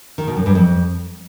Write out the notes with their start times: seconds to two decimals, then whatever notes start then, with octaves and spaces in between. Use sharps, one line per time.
0.18 D#3
0.27 B2
0.37 F#2
0.46 G2
0.55 F2